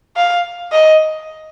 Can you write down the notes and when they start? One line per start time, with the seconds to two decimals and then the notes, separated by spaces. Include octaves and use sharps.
0.17 F5
0.72 D#5